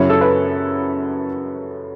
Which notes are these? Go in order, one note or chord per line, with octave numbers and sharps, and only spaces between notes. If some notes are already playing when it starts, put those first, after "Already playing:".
Already playing: F#2 C#3 F#3 C#4 E4 C#5
A4
B4